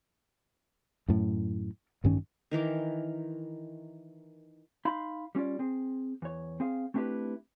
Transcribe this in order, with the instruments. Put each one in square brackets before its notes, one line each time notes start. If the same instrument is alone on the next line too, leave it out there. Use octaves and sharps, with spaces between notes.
[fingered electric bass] F#2 A2
A1 G2 D#3 C#4
[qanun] D#3 E3 A#4 D6
[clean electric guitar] D#4 F5 B5 C6
G3 C#4 F4 D5
C4 G#4
E2 C#5
C4 G#4 F5
A3 C4 D4 E4 G4 B4